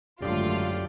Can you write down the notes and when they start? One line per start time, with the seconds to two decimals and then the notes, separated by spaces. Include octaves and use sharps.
0.22 G#1 F#2 D3 F#3 A3 F4 G4 D5